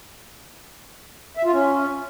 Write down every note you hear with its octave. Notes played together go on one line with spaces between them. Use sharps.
E5
F4
C#4